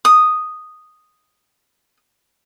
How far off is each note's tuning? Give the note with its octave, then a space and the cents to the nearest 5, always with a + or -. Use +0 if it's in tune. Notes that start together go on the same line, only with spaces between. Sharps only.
D#6 -5